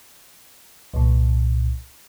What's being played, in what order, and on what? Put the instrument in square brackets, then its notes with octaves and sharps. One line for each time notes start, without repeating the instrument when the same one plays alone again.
[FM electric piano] C2 A#2